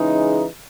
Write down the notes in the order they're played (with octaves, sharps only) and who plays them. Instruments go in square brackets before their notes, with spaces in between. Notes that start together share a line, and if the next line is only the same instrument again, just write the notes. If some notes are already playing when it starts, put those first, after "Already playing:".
Already playing: [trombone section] C#3 E3 G#3 D#4